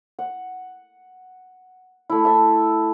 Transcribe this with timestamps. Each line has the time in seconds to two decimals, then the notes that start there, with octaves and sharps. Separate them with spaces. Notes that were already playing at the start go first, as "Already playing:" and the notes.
0.19 F#5
2.10 A3 E4
2.25 E5 A5